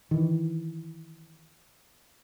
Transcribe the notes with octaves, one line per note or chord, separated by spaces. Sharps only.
D#3 E3